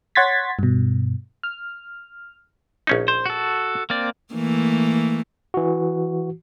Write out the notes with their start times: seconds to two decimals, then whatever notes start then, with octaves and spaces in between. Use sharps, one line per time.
0.15 C#5 F#5 C6 G#6 A6 B6
0.59 G2 B2
1.43 F6
2.87 A#1 C#4 D#4
3.08 C5
3.26 F#4 A4
3.90 A#3 C4 D5
4.34 E3 A3 A#3
5.54 E3 F#4